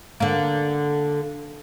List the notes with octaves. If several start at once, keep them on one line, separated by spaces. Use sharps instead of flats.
D3 A#3